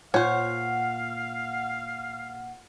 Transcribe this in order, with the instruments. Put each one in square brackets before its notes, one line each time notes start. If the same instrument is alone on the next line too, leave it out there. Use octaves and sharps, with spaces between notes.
[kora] A#2 [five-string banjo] C5 C#5 [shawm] F5 [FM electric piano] F#5